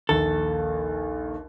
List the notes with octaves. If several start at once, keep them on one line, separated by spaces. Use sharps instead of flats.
A#1 D#2 A4